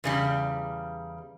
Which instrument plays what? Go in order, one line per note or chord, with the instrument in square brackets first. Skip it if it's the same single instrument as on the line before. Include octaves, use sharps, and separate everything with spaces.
[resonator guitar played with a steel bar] E2 C#3 G3